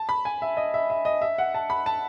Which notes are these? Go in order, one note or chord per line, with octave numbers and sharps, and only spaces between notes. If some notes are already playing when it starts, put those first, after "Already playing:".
Already playing: A5
B5
G#5
E5
D#5
E5
E5
D#5
E5
F#5
A5
B5
A5